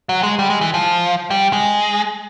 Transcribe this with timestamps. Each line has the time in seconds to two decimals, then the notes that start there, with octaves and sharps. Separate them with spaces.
0.09 F#3
0.23 G#3
0.39 G3
0.50 G#3
0.61 E3
0.74 F3
1.30 G3
1.53 G#3